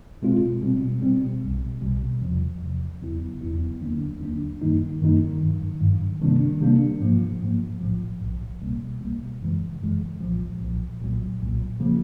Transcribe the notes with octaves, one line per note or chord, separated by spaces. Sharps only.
B2 G#3 C4 F4
B2 G3 C4
B2 G3 C4
B1 B2 G3
B1 B2 G3
E2 C3 F3
E2 C3 F3
E2 C#3 F#3 B3 E4
E2 C#3 F#3 B3 E4
D#2 D3 F#3 A#3 D4
D#2 D3 F#3 A#3 D4
F#2 D#3 G3 A#3 D#4
F#2 D#3 G3 A#3 D#4
G2 D#3 F#3
G2 D#3 F#3
C3 D#3 G3 A#3 D4
C3 D#3 G3 A#3 D4
G#2 F3 A#3
G#2 F3 A#3
A#1 A2 F3
A#1 A2 F3
C2 B2 G3 A#3
C2 B2 G3 A#3
F#2 C#3 E3 G#3
F#2 C#3 E3 G#3
B1 A#2 F3
B1 A#2 F3
B1 A#2 F#3
B1 A#2 F#3
C#3 F3 A#3